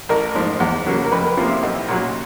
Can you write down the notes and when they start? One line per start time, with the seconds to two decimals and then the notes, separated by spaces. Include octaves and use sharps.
0.09 A1 A#4
0.35 G#2 F3
0.60 E2
0.86 C#3 F#3 A#3
1.05 A#4
1.12 F2 B4
1.25 A#4
1.37 C3 F3 A#3 F4
1.50 E4
1.63 B1
1.88 A#2 F#3